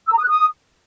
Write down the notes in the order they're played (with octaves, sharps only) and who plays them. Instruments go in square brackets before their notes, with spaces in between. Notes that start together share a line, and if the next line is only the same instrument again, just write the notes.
[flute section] E6
A#5
D#6
F#6
D#6